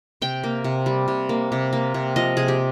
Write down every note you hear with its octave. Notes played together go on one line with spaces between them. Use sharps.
C3 G5
A#3
C3
G3
C3
A#3
C3
A#3
C3
F3 D#5
C3 G#4
G4